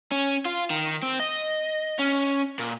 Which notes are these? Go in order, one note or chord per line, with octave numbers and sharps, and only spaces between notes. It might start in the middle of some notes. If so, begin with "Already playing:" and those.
C#4
F4
D#3
C4
D#5
C#4
A#2